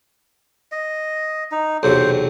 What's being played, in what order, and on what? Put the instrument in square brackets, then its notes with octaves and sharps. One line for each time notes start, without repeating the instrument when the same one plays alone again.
[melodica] D#5
D#4
[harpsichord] B1 E2 C3 [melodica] C5